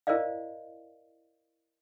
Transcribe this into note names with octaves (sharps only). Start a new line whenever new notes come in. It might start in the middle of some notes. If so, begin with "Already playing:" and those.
E4 A#4 C5 D5 D#5 F5